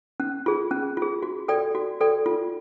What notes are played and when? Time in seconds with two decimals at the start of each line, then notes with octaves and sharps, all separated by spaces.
0.20 C#4
0.46 F4 G#4
0.71 C#4
0.97 F4 G#4
1.23 F#4
1.48 A4 D5 G5
1.75 F#4
2.01 A4 D5 G5
2.26 F4